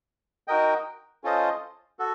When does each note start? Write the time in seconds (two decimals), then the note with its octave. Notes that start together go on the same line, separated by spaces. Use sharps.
0.48 D#4 F#4 A#4 D#5 G5
1.24 C#4 F4 A4 C5 D#5
1.99 F#4 A4